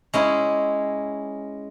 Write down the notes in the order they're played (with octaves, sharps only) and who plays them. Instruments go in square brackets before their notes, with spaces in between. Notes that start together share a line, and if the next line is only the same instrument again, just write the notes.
[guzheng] G#3 C#4 E4